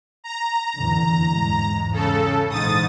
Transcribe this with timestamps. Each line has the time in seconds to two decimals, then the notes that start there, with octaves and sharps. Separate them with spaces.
0.24 A#5
0.77 F#1 E2 D3
1.29 E2 G#2 G#3
1.91 C#3 A4
2.48 A#1 G#2 D3 E3 D#6 A6